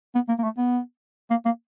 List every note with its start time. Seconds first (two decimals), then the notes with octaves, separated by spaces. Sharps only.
0.15 B3
0.28 A#3
0.39 A#3
0.43 A3
0.57 B3
1.30 A#3
1.45 A#3